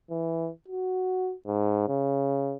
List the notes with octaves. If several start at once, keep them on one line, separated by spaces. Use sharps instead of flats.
E3
F#4
G#2
C#3